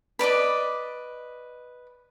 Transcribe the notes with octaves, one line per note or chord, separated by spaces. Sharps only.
B4 D5 D#5 D6